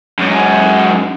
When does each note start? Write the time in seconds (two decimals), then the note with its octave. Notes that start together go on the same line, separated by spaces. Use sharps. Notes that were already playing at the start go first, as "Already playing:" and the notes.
0.19 F#2 G#3